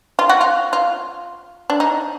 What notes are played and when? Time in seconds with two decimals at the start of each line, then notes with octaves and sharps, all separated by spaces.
0.19 F4
0.29 F#4
0.41 F4
0.73 F4
1.70 D4
1.80 D#4